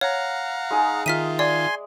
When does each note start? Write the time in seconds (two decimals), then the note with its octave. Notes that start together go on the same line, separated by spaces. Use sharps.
0.01 C#5 F5 F#5 A#5
0.71 G#3 D#4 G#4
1.06 D#3 F4 E5 F6 B6 D#7
1.39 D5 G#5 C6 D6